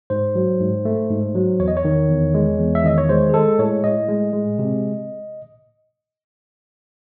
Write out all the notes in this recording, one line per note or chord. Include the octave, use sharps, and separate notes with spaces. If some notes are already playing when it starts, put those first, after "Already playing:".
G#2 C5
F#3
G#2
A3
G#2
F#3
E2 C#5
D#5
C#5
D#3
E2
G#3
E2
E5
D#3 D#5
C#5
G#3 C5
G#4
G#3 A4
A2 C#5
A2 D#5
G#3
G#3
C3